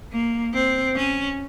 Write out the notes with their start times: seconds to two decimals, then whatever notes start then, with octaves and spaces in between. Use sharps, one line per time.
0.12 A#3
0.54 C4
0.96 C#4